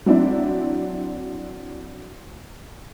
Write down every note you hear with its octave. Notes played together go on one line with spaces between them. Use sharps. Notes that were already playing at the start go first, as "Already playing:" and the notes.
F#3 C4 D4 E4